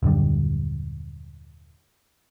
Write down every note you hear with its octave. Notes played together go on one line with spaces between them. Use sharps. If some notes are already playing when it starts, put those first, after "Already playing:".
D#1 F#2 D3 G3